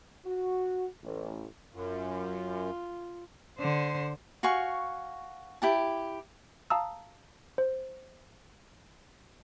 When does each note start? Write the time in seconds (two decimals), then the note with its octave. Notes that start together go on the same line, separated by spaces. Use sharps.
0.25 F#4
1.03 A1
1.74 F#2 F4
3.59 D3 C5
4.43 F#4 F5 G#5 C#6
5.62 E4 G4 A5
6.70 F5 A5 A#5 D#6 E6
7.58 C5